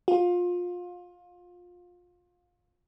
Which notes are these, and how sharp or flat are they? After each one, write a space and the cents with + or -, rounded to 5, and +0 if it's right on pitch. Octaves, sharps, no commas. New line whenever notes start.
F4 +25